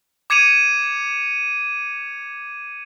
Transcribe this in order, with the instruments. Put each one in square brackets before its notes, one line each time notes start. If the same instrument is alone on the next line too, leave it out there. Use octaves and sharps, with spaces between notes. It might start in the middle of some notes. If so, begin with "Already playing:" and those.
[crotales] D6 G#6 C#7 D#7 F7